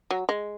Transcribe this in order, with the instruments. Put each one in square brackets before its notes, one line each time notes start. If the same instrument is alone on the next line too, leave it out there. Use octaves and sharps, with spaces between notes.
[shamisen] F#3
G#3